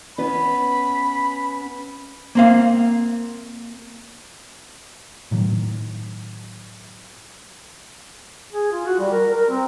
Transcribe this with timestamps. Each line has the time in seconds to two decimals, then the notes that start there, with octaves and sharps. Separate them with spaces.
0.18 B3 C#4 B4 B5
2.35 A#3 C4 F5
5.31 A2 D#3 F#3
8.53 G#4
8.72 F4
8.86 F#4
8.99 G3
9.12 A#4
9.33 A#4
9.49 C4